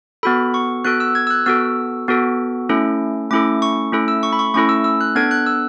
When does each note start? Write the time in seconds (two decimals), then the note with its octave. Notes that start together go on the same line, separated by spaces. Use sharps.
0.23 B3 F#4 A4 B5
0.54 C#6
0.85 B3 F#4 A4 F#6
1.00 E6
1.15 G#6
1.27 E6
1.30 F#6
1.46 B3 F#4 A4 E6
2.08 B3 F#4 A4
2.69 A3 C#4 E4 A4
3.31 A3 C#4 E4 A4 D6
3.62 C#6
3.92 A3 C#4 E4 A4
4.08 E6
4.23 C#6
4.33 B5
4.39 C#6
4.54 A3 C#4 E4 A4 C#6
4.69 E6
4.84 E6
5.01 F#6
5.15 B3 D4 A4 G#6
5.31 F#6
5.46 E6